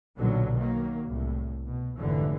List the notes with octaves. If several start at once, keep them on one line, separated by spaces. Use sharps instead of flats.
B1 A#2 D3 F#3
D#3 F#3 A#3
C2 A2
B2
F1 G#2 D3 E3